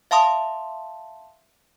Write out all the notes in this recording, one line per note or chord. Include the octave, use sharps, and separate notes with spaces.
E5 F5 A5 C6 D#6